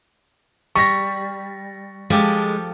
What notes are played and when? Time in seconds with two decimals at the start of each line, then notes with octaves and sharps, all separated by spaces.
0.75 G3 C#6 A#6
2.10 F3 G#3 G4 A4